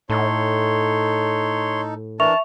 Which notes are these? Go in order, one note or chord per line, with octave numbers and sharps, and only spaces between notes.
A2 D#4 A4 C#5 C6
E3 D4 A#4 E5 A5 C#6 F7